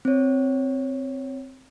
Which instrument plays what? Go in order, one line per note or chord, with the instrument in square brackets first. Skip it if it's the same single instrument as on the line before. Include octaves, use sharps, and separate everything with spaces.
[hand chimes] C4 C#5